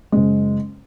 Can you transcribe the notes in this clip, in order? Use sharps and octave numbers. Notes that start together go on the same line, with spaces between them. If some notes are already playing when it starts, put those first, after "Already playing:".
F#1 G#3